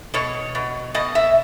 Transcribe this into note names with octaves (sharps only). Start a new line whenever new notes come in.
B2 C#5
B2
B2 D#5
E5